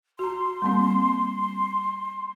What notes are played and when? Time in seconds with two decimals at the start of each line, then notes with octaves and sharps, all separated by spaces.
0.19 F#4 A#5 C6
0.62 G3 A#3 C4